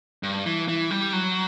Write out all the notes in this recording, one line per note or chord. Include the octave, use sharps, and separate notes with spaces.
G2
E3
E3
G3
F#3